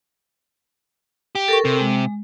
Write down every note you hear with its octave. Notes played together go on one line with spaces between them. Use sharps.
G4
A4 A#4 C#6
C3
G#3